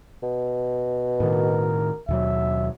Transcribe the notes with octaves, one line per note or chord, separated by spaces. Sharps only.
B2
A2 D#3 A#4
D#2 B2 F#3 E5